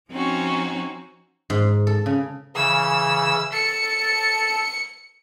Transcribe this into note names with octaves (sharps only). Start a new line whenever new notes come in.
F3 C4 C#4 D#4 F#4
G#2
A4
C#3
C#3 E3 E6
A4 A5 C#7